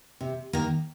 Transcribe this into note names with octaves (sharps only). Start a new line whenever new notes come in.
C3
D#3 A#3